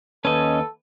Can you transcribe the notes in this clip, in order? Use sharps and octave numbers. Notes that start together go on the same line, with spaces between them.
D#2 C#4 A4 B4 D#5